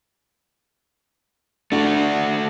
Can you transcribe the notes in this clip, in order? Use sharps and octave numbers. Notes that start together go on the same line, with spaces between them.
A3 D4 F#4